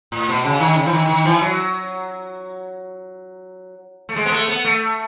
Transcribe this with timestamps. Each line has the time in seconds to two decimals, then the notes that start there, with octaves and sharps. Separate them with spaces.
0.12 A2
0.29 B2
0.45 C#3
0.60 D#3
0.76 C#3
0.86 E3
0.93 D#3
1.09 D#3
1.25 E3
1.41 F#3
4.09 A3
4.16 G#3
4.26 B3
4.32 A3
4.48 B3
4.64 A3